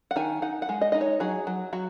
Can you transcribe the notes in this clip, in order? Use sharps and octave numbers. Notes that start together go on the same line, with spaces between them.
F#5
D#3 G#5
D#4 F#5
F#5
G#3
D#5
D#4 D#5
C#5
F#3 G#4
F#3
F#3 F#4